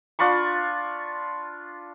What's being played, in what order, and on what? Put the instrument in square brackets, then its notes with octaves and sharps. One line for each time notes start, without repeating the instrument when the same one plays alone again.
[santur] D4 F4 B5 C#6